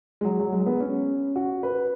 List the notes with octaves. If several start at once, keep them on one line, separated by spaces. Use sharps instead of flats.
G#3
F#3
F#3
G#3
B3
C#4
F#4
B4